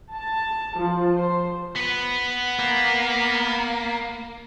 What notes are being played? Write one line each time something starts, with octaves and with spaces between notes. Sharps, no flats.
A5
F3
C5
B3 B4
A#3